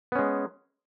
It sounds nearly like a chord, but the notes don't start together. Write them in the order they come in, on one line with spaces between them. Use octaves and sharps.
B3 C#4 G#3